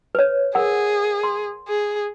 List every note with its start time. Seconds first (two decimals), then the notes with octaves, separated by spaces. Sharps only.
0.15 B4 C#5
0.55 G#4 A#4 F#5
1.23 C6
1.68 G#4